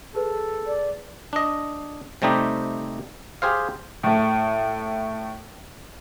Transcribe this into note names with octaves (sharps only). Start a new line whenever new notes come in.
G#4 A4 B4
D5
D4 D#5
C3 G3 A3 C4 D#4 G4
G4 G#4 C5 F5
A2 A3